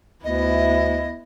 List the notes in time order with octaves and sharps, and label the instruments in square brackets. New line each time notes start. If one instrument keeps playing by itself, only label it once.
[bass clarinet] D2 [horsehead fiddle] B3 E4 [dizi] D#5